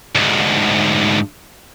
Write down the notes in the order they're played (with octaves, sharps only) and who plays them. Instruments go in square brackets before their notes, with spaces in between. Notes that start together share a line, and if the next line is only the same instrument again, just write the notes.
[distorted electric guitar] D2 G#2